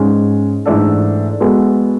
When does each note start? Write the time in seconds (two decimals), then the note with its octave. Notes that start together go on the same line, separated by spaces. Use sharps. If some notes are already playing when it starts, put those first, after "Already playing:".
Already playing: G#2 G#3 C#4
0.66 G#2 E3 A3 D4 A4
1.40 G#3 B3 F#4 A4